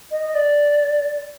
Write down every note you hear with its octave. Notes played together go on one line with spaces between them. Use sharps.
D#5
D#5
D5